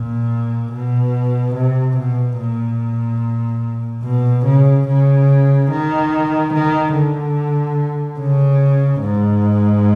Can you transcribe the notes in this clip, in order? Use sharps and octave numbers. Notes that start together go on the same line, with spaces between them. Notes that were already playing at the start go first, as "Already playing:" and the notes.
Already playing: A#2
B2
C3
B2
A#2
B2
C#3
C#3
D#3
D#3
D3
C#3
G#2